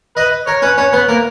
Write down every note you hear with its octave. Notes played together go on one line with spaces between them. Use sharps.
B4 D#5
A#4 C#5
C#4 B4
C#4 C#5
B3 B4
A#3 A#4